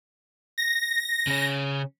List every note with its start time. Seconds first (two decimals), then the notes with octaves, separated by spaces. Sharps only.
0.58 A#6
1.27 C#3 C#4